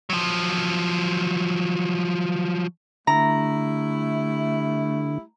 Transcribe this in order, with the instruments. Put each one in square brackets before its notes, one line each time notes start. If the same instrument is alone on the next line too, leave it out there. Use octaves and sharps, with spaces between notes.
[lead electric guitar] F3 F#3
[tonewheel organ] D3 [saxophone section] G3 E4 [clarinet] A3 [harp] A#5